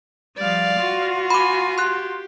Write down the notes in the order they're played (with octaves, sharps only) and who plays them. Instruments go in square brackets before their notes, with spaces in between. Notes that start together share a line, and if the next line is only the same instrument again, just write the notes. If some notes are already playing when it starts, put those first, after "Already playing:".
[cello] F3 G3 [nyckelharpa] D5 F5
[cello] F4 F#4
[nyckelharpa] G#5 [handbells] B5 D6
[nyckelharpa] G4 [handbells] C6 F#6